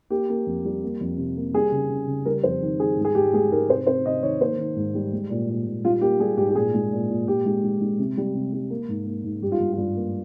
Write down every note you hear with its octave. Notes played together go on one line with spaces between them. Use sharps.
A#3 G4
A#3
F2
G3
A#3
F2
C3
A#3
G3 G#4
C#3
C#3
C#3
G3 A#4
F2 C5
D#3
G3 G#4
G#2
G#4
G#2 G4
G#3 G#4
G#2 A#4
C3 C5
C3 C5
C3 D#5
D#3 C#5
A#3 C5
D#3
G#2
G3
G#3
A#2
A#2
A#2
G3 F4
A#3 G4
G3 G#4
G#2 G4
G4
A#2 G#4
G#3
A#2
A#2
A#2 G4
G#3
G#3
G#3
C3
G3
C3
G3
A#3
G#2
A#3
G#2
G2 G4
F4
G2
G2 F4
A#3